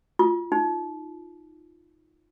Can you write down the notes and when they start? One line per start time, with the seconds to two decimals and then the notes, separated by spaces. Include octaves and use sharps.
0.19 F4
0.52 D#4